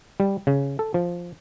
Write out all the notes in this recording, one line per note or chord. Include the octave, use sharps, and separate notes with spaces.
G3
C#3
A4
F3